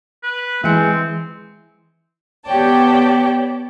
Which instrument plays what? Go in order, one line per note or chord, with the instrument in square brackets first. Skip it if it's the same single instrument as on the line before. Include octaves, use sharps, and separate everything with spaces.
[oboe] B4
[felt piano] E3 C#7 [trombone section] G#3 [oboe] C4
[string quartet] B3 G4 C#5 D5 G5 A5